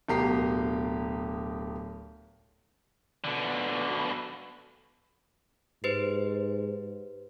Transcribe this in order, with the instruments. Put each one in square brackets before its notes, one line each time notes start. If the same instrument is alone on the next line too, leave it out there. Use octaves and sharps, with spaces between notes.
[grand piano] D1 B2 G4 A#4 A#5 C7
[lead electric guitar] B2 D3
[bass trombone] G#2 [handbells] G4 B4 C5